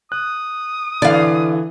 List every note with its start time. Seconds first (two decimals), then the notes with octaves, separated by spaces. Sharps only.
0.12 D#6 F#6
1.02 D3 E3 D5 F5